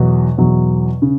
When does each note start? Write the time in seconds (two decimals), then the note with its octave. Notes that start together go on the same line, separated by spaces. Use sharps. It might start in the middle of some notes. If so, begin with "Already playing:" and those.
Already playing: E2 B2 F#3
0.38 E2 B2 F#3
1.02 C#3